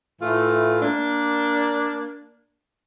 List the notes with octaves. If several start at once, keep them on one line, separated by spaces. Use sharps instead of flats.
A2 E3 A3 F4
A#3 D4